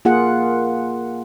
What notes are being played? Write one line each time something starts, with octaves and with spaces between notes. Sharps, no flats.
A#3 F4 G#4 F#5